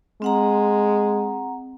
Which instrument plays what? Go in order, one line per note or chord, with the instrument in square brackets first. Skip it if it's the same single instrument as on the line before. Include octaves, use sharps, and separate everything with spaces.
[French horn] G#3 [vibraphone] C4 F#5 A#5